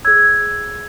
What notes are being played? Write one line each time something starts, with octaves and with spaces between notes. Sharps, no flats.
G#4 C#5 E6 G#6